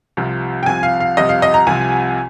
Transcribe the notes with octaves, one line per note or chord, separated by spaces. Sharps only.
C2 C3 F3
G5
C2 C3 F3 G#5
F5
F5
C2 C3 F3 D#5
F5
D#5
A#5
C2 C3 F3 G#5